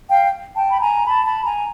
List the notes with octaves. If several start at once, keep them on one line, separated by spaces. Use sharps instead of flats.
F5 G5
G5 A5
B5
G#5 A#5
A5 B5
A5 B5
G#5 A#5